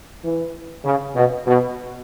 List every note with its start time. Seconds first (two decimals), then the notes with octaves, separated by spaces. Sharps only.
0.23 E3
0.84 C#3
1.15 B2
1.46 B2